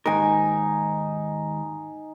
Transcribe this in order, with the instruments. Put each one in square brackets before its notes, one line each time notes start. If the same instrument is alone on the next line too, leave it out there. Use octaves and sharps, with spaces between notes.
[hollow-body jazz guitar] D#2 G#2 A#4 [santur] D#4 G#5